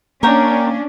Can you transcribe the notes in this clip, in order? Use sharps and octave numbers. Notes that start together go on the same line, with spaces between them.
A#3 C#4 D4 A#4 C#5 G5